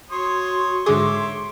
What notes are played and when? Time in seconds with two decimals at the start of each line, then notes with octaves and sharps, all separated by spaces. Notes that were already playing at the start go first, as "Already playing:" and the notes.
0.11 F#4 C#5 C6 D#6
0.86 G#2 D3 G#4 C#5 E5 D6